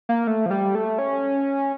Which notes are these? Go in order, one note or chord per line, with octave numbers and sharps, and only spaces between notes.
A#3
A3
F3
G3
A3
C#4